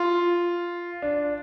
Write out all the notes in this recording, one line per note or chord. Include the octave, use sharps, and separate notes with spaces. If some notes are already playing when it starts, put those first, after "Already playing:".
Already playing: F4
D4